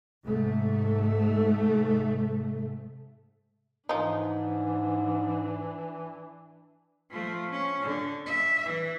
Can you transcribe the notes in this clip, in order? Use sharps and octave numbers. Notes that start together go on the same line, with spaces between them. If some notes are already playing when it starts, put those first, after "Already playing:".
G#2 C3 A3
G#2 E3 F3 D4 D#4
F3 A3
C#4
D3
E5
E3